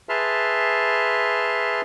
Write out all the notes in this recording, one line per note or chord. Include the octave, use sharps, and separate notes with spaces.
G#4 B4 E5 A5 C6 F6